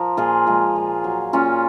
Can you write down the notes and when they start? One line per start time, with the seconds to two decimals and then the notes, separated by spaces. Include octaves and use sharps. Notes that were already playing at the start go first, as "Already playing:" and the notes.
Already playing: F3 A#4
0.17 A#2 F4 G#4
0.47 F3 G#3
0.76 A#2
1.04 F#3
1.33 A#2 C#4 F4